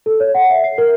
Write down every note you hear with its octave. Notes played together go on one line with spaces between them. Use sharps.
A4
C#5
F#5
E5
C7
A#4